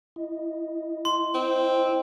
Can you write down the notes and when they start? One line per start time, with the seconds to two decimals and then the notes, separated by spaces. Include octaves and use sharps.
0.16 E4 D#5
1.05 C6
1.34 C4